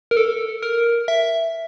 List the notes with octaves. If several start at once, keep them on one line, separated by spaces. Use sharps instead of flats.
A#4
A4
A#4
E5